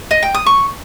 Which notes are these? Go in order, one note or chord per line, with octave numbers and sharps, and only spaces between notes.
D#5
G5
D#6
C#6